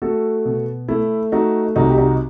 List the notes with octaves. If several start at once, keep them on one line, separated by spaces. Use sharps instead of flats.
A3 F#4 A4
B2
A3 E4
A3 D#4 F#4
C2 D#4 F#4
G4
D#4 F#4